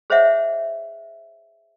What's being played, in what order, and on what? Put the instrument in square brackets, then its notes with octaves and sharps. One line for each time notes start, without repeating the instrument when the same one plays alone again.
[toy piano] G#4 C5 C#5 D#5 E5 F#5